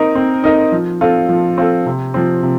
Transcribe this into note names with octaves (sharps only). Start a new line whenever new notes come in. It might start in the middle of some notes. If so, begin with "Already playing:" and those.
Already playing: C4 D#4 A#4 D#5
C4
D#4 A#4 D#5
F3
C4 F4 A4
F3
C4 F4 A4
C3
F3 C4
C3